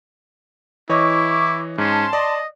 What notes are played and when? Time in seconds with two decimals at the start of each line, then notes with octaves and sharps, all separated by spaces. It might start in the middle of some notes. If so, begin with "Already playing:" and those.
0.89 E3 E4 C#5 D#5 C#6 D6
1.78 G#2 C#4 A5 C6
2.13 D5 D#5